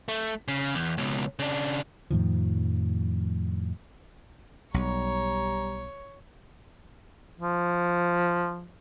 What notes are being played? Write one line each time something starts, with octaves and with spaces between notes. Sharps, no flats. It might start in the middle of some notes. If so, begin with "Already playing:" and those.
A3
C#3
E2
C#2 B2
C#3 D4
F2 A2 D#3 F3
B1 G3 C#5 A#5
F3